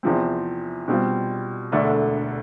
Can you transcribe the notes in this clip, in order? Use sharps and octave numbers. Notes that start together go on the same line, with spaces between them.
E2 C3 F3 C4
B2 G3 C4 F4
E1 D2 D3 A3 D4